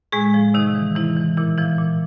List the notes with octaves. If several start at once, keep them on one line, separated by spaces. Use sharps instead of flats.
A2 G#3 G#4
F3
C3 D#3 D#4
E3
C3 E3 E4
E3
A#2 E3 E4
E3 F3 E4
A#2